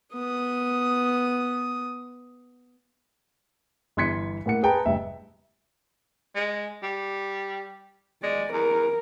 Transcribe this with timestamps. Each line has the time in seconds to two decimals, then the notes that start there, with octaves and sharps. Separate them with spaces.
0.14 B3 D#6
3.97 G1 E3 C6 G#6 B6 C#7
4.46 A2 A#3 F#5 C#7
4.63 G#4 B4 G5 A5 A#5
4.85 F1 G2 E5 G5
6.35 G#3
6.83 G3
8.23 G#3 D5
8.52 E2 A#4